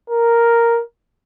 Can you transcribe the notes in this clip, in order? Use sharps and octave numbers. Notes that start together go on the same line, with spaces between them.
A#4